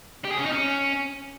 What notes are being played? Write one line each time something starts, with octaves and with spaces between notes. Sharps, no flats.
G4
G#4
C#4
D#4
C#4